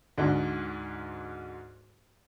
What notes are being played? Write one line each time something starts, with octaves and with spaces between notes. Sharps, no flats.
D2 G#2 D4